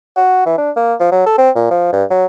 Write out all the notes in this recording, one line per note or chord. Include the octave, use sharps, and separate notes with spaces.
F#4
E3
D4
A#3
F3
F#3
A4
C4
A#2
F3
G2
F#3